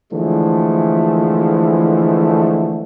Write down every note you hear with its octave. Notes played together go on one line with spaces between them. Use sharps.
D3 E3 F3 G#3 A3